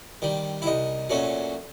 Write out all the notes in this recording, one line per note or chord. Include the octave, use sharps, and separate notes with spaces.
D#3 G3
E4
C2 D#4
A#2 F#3 A3 C#4